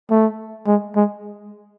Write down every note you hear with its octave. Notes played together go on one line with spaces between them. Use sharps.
A3
G#3
G#3